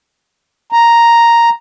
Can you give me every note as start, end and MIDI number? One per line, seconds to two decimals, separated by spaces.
0.72 1.49 82